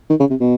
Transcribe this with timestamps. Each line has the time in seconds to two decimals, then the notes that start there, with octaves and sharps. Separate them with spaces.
0.10 D#3
0.20 C#3
0.30 C3
0.40 B2